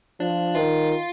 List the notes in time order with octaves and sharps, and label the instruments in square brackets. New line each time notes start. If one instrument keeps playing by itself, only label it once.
[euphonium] F3 [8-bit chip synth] D4
[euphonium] D#3 [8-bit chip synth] F4